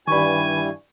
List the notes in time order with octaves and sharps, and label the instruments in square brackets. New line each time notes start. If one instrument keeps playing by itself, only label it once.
[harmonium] G2 E3 G3 [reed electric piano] D#3 B5 [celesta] D5 C#6 [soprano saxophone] G#5